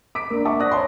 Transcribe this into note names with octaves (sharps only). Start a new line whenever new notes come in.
D6 B6 D7
A#3 D4
E5 F#5 A5 C#6 D6
D5 D#6 F#6 A#6
C#5 A5 C6